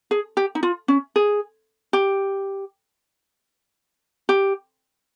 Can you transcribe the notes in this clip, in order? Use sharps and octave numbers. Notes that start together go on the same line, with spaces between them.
G#4
G4
D#4
F4
C#4
G#4
G4
G4